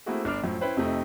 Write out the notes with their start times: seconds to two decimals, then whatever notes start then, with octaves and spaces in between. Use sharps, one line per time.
0.06 A3 A#3 C4 E4 F#4 G#4
0.25 G1 D4 D6 F6
0.44 F#2 A2 F3
0.61 C#4 E4 B4 C5 G5
0.77 F2 C3 F3 A3 D#4